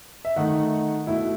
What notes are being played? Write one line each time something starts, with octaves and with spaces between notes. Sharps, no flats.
E5
D#3 A3 D#4 F#5
B2 A3 E4